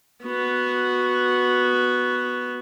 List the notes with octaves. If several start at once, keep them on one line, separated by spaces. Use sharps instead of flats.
B3 F#4